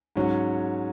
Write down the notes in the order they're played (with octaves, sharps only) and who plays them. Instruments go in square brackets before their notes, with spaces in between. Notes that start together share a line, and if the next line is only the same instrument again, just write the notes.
[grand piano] G#2 F#3 C#4